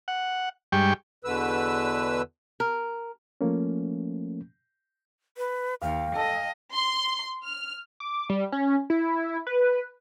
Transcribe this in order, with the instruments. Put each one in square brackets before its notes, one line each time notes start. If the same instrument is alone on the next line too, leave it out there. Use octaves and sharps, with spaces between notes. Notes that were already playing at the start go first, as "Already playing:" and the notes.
[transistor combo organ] F#5
G2 G3 G#3 G5 C#6
[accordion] E2 B2 D3 B4 E6
[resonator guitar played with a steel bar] A#4
[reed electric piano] F3 A3 A#3 C#4
[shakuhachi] B4
[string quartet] D#2 [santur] F5 [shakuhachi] G5
[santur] A4 [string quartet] D#5
[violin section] C6
F6
[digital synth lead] D6
G3
C#4
E4
B4